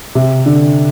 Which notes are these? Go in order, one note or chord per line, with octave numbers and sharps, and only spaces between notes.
C3
D3